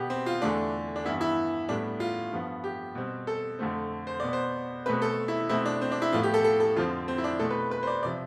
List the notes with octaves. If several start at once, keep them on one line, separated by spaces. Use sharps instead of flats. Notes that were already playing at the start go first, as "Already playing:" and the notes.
Already playing: B2 B3 G4
C4
F4
E2 D3 A3 D4
D4
G2 E3 B3 E4
E4
A2 G3 B3 D4
F4
G2 F3 B3
G4
B2 G3 C4
A4
F2 D3 A3 C4
C5
B2 B3 D5
C5
B2 A3 C4 B4
A4
E4
B2 A3 C4 E4
D4
C4
D4
E4
A2 F3 B3 F4
G4
A4
A4
A4
F2 D3 F3 C4 F4
C4
E4
D4
B2 A3 C4 A4
B4
B4
C5
D5
C3 F3 D5